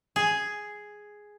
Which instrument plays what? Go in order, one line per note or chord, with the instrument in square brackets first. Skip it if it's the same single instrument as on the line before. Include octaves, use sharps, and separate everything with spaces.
[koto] G#4